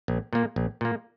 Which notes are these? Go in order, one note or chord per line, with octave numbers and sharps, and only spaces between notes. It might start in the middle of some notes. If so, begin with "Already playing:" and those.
A#1
A#2 A#3
A#1
A#2 A#3